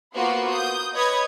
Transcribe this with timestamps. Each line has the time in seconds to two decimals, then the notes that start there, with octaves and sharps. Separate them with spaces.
0.15 A#3 B3 F4 F#4 B4 C5
0.52 D#6 G6
0.94 B4 C#5 D#5 B5 D#6 G#6